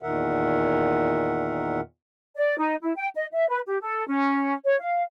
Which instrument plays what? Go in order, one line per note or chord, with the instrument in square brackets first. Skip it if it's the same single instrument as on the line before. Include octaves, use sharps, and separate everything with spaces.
[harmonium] E2 A#2 D#3 A#4 E5 F#5
[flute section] D5
D#4
E4
G5
D#5
E5
B4
G4
A4
C#4
C#5
F5